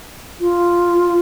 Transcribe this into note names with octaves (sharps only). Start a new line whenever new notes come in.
F4